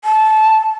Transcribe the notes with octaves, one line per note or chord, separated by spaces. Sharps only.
A5